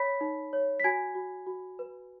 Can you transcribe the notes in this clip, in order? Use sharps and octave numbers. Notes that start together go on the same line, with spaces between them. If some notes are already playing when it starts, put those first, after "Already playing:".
Already playing: C#5 B5 B6
D#4
C#5
B6
F#4 G#5 G#6
F#4
F#4
B4